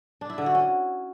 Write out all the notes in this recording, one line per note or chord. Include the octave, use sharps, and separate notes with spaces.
D4
E4
D3
F#4
C#4